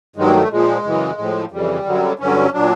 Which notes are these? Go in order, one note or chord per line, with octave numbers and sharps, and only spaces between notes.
G2 D#3 F#3 G#3
A#3
A3
A#2 F3 G#3
F#2 C#3 E3
A2 F3
F2 C#3 E3 G3
F#2 D3 F#3
G2 D3 F#3 C#4
A#2 F#3 D4